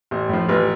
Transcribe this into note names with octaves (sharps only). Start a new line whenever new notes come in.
A1
A2 F3
A1 B4